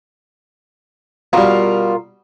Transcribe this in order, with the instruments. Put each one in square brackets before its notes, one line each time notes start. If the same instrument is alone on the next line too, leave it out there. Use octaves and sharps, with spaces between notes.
[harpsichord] B2 G3 [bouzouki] F4 A#4